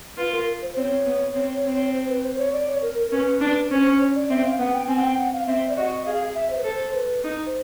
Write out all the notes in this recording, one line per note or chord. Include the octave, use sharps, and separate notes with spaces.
F4 B4
A#4
C5
C4 C#5
B3
C4
C4
C#5
C5
B4
C5
C#5
D5
C#5
A#4
A#4
C#4 B4
D4 B4
C#4 C5
C5
C#5
D5
C4 E5
F5
B3 F#5
G5
C4 G#5
F#5
G5
F#5
F5
C4 E5
D5
F#4 D#5
G#4 F5
E5
C5
B4
A4 C5
B4
D#4
C5